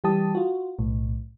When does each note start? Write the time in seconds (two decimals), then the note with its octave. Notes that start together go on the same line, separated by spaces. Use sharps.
0.04 E3 G3 G4 A5 D#6
0.35 F4 F#4
0.79 B1 A2